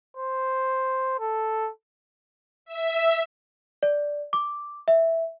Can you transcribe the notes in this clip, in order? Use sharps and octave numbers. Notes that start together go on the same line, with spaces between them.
C5
A4
E5
D5
D6
E5